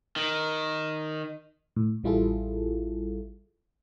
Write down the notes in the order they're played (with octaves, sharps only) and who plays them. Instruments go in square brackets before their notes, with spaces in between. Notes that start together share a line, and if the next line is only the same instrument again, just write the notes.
[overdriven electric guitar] D#3
[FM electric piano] A2
A1 G3 E4 F4 G#4 A4